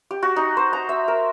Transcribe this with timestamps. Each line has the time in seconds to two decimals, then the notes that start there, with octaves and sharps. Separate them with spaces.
0.11 G4
0.23 F#4
0.36 D#4
0.57 C5
0.73 A#5
0.89 E5
1.08 A#4